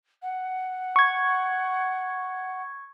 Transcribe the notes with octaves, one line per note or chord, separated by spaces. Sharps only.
F#5
C#6 G#6